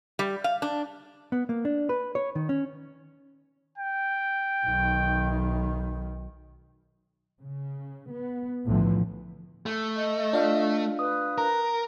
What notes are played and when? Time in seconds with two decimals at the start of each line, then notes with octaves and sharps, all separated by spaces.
0.19 G3
0.44 F5
0.62 D4
1.32 B3
1.49 A#3
1.65 D4
1.89 B4
2.15 C#5
2.35 D#3
2.49 C#4
3.78 G5
4.66 B1 D#3
7.39 C#3
8.10 B3
8.65 B1 E2 A2 D3 E3 F3
9.66 A3
9.96 D#5
10.33 D4 F4 F5
10.99 B4 D#6
11.38 A#4 A#5